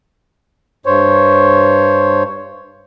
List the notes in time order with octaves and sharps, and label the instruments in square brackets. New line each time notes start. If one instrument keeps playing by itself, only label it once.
[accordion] G2 C5 C#5